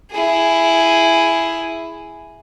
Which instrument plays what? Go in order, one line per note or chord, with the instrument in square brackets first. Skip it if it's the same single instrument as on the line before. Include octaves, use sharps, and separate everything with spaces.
[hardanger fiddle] E4 G#4